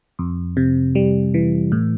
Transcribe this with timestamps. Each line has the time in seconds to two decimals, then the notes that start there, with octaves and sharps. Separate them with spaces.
0.19 F2
0.57 C3
0.95 G3
1.34 E3
1.72 A2